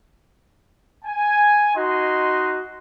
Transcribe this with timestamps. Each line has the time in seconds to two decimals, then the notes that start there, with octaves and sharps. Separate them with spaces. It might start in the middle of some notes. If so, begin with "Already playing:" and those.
1.05 G#5
1.76 D#4 F#4 D#5 C6